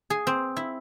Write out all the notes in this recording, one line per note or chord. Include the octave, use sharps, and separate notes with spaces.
G#4
C4
E4